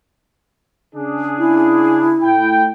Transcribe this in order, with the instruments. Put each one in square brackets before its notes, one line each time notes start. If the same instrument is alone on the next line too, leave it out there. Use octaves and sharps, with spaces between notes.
[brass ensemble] C#3 D4 G#4
[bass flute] E4
[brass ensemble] A2 G5